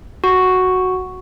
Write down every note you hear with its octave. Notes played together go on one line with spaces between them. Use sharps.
F#4